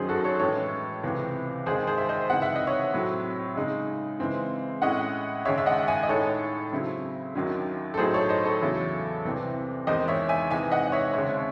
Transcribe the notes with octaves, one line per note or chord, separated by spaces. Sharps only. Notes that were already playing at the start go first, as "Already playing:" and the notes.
Already playing: F#2 D#3 F#3 C#4 G#4 C5
F#4 A4
A4 C#5
A2 E3 G#3 C#4 A4 C#5
C#2 C3 E3
D#2 D#3 G#3 G#4 C5
G#4 C5
E5
C5 D#5
C#2 C3 E3 C4 D#4 F#5
E5
D#5
C#5 E5
A2 F#3 C4
C#3 G#3 D#4
C#3 E3 G#3 C4 E4
A2 G#3 C#4 E4 D#5 F#5
D#2 C#3 G#3 C#5 E5
E5
D#5 F#5
E5 G#5
D#5
A2 G#3 D#4 A4 C#5
C#3 F#3 C4 E4
D#2 D#3 F#3 C#4 E4
A4
A2 F#3 A3 D#4 G#4 C5
A4 C#5
C5 D#5
A4 C#5
E2 C#3 F#3 C#4 E4
C2 C3 E3 C4
E2 D#3 G#3 D#4 C5 D#5
C#5 E5
E5 G#5
C3 E3 G#3 D#4 E5 G#5
D#5 F#5
D#5
C#5 E5
D#2 C#3 G#3 C4 C#5 E5